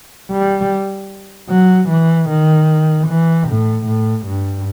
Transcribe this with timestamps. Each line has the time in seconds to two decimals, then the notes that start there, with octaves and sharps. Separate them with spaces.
0.32 G3
1.50 F#3
1.89 E3
2.30 D#3
3.07 E3
3.48 A2
3.86 A2
4.26 G2